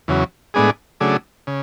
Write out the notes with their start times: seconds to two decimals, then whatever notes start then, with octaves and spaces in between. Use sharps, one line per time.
0.08 E2 C#3 F#3
0.54 A2 G#3 B3 D4 G#4
1.00 C#3 F#3 A3 D4 G#4
1.47 C#3